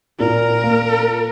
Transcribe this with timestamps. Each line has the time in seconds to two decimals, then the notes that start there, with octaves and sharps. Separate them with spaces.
0.19 A#2 A#4
0.63 A#3